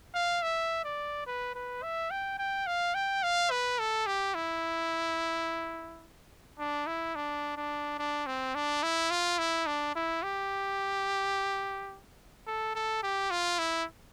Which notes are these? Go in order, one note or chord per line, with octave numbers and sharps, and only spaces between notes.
F5
E5
D5
B4
B4
E5
G5
G5
F5
G5
F5
B4
A4
G4
E4
D4
E4
D4
D4
D4
C4
D4
E4
F4
E4
D4
E4
G4
A4
A4
G4
F4
E4